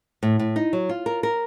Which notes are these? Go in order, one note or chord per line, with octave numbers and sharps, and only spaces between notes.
A2
A2
D#4
F#3
F4
A#4
A#4